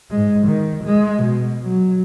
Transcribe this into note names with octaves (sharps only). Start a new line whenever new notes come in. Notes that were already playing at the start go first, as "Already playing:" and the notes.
G#2 G#3
D#3
G#3
B2
F#3